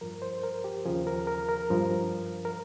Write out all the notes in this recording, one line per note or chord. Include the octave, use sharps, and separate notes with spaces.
G2 F3 A#4
C5
A#4
G4
D#2 C#3 F3 G#4
A#4
A#4
A#4
G2 F3
A#4